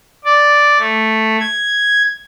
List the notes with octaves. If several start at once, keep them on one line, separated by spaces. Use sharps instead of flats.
D5
A3
G#6